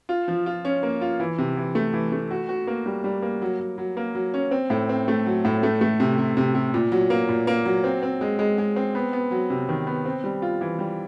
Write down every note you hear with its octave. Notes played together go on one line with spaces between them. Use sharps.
F4
F3
F4
C#4
A#3
F4
E3
C3
E3
A3
E3
A3
F#4
F#4
A#3
G3
G3
A#3
F#3
F#3
F#3
A#3
F#3
C#4
C4
A2
C4
A3
F#3
A2
A3
A3
C3
C3
C3
C3
A#2
F#3
A#3
A#2
A#3
F#3
C4
C4
G#3
G#3
G#3
C4
B3
B3
F#3
C3
D#3
B3
C4
G3
F4
E3
G3